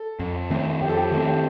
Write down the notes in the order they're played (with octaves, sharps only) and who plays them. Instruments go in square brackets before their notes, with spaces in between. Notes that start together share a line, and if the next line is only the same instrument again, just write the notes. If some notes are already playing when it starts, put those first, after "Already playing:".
Already playing: [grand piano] A4
[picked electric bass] F2
D#3 A3 C4
[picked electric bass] F2 [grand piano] G4
[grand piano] A4
G4
[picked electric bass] D#3 A3 C4 [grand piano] A4
[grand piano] G4